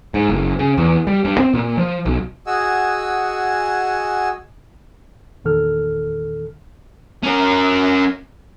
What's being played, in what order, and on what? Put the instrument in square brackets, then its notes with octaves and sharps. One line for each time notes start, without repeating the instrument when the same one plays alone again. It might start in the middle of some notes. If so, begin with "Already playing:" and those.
[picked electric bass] G#2
F#1
C#3
E2
G3
G2
C4
A#2
F3
B1
[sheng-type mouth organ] F#4 G#4 D#5 F#5 G#5 E6
[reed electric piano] E2 A#2 D#3 A4 F6
[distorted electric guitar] C#4 A#4